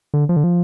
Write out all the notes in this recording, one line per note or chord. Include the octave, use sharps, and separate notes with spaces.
D3
F3
D3
F3